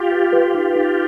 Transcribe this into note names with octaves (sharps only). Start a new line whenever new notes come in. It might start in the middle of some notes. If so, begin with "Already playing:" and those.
Already playing: F4 G4
B4
B4
D#4
D#4